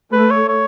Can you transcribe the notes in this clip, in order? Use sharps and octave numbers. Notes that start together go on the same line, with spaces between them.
A3 B4
C#5
C#5